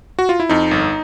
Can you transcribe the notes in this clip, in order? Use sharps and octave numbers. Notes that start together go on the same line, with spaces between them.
F#4
F4
E4
F2 D#4
G1